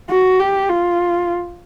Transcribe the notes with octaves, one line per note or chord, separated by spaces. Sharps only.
F#4
G4
F4